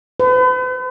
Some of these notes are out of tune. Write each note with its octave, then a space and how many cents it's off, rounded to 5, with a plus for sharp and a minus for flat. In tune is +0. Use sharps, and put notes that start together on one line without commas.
B4 +45